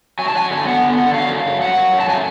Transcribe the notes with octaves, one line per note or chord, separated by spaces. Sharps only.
F#3 G#5
A5
F#3 G#5
D3
B3 F#5
D3
D3
F#3 F5
F#2
F#2
F#3 F#5
F#3
F#2
A5
A3 G#5